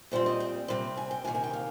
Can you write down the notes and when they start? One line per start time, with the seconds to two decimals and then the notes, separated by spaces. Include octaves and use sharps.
0.11 A#2 G3 C4 C5
0.26 D#5
0.40 G5
0.68 C3 G3 C4
0.97 G#5
1.11 G5
1.24 C3 D#3 A#3 G#5
1.35 G#5
1.44 G5
1.53 F5